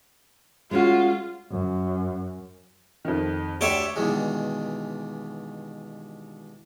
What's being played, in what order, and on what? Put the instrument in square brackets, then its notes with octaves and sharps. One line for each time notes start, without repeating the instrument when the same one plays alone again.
[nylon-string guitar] G#3 C#4 F#4 [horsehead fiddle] F4
[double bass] F#2
[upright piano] F2 D#3
[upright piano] D2 D5 [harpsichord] G4 C#5 E5
[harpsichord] G2 B2 D#3 E3 G3 G#3